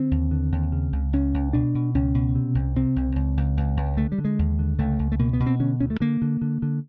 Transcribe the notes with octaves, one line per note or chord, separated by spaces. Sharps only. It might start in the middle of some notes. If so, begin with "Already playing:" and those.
Already playing: D3 C4
D#2
D3
D#2
C#3
C#2
C#2 C#4
C#2
B2 D4
B2
C#2 C#4
B2
C3
C2
C3 C4
C2
C#2
C#2
C#2
C#2
D3 A3
G3
D3
G#3
D#2
D3
C#2 A3
C#2
A3
B2 A#3
B3
B2
C4
D3 C#4
D2 C#4
A3
D3 A#3
D3
D3
D3